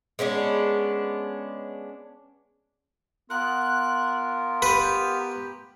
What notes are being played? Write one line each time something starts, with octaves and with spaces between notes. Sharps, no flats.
G#3 B3 C#4 D4
B3 F4 A#4 F#6
G4 B4